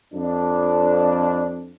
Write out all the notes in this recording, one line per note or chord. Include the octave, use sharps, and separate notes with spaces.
F2 D4